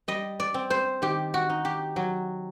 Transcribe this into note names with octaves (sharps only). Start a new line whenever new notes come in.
G3 D#5
D5
C4
C5
D#3 G4
F#4
D#4
G4
F#3